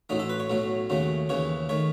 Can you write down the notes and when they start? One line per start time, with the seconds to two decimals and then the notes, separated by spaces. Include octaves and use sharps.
0.09 A1 A2 F#3 A3 D#4
0.20 A4
0.29 B4
0.40 C#5
0.50 B1 A2 F#3 A3
0.90 D#2 C#3 F#3 A3
1.29 D#2 C#3 E3 C#5
1.69 D#3 A3 C#5